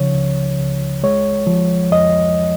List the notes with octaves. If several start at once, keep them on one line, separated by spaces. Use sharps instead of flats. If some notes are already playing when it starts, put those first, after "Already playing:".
Already playing: C#3 F3 C#5
C#2
C#2
G#3 C#5
F3
F2 D#5